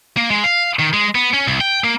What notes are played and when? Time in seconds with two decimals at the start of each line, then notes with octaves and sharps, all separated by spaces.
0.17 A#3
0.31 G#3
0.44 F5
0.79 D#3
0.93 G#3
1.15 B3
1.34 C#4
1.47 C2
1.61 G5
1.84 A#3